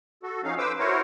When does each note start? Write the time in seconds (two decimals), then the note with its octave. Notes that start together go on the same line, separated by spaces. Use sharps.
0.23 F#4 A4
0.44 F3 C#4 D#4 F5
0.58 B4 C5 D6 E6
0.79 E4 F#4 A#4 C5 C#5